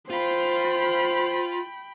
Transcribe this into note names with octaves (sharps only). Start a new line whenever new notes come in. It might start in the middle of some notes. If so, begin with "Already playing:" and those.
F4 C5 G5 B5